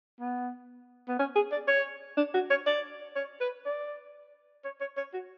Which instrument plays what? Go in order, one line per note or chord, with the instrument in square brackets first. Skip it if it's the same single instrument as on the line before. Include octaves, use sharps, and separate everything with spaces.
[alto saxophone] B3
B3
C#4
G#4
D5
C#5
D4
F#4
C#5
D5
C#5
B4
D5
C#5
C#5
C#5
F#4